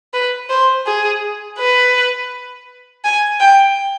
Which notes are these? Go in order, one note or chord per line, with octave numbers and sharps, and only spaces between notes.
B4
C5
G#4
B4
G#5
G5